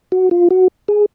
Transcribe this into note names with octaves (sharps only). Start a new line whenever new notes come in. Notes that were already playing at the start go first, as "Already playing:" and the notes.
F#4
F4
F#4
G#4